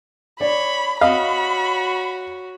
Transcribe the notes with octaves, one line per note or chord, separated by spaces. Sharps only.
C#5 D5 B5
F#4 C#5 D#5 F5 B5